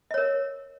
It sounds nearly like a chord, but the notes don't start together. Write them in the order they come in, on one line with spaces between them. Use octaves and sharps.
D#5 C#5 A#4